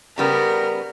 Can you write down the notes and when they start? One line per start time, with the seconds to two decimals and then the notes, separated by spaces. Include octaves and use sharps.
0.18 C#3 G3 B3 A#4